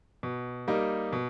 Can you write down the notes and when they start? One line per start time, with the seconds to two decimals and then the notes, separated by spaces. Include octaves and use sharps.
0.23 B2
0.68 G3 A#3 D#4
1.13 B2